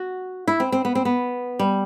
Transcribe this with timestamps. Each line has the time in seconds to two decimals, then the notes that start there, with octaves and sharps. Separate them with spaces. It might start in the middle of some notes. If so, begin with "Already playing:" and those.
Already playing: F#4
0.48 E4
0.60 C4
0.72 C4
0.85 B3
0.95 C4
1.05 B3
1.59 G3